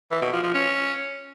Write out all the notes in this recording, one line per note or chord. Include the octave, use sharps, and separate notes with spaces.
E3
B2
F3
F3
C#4